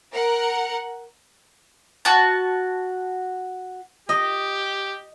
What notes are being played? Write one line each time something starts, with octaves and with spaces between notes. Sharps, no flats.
A#4 F#5
F#4 A5
G4 D#5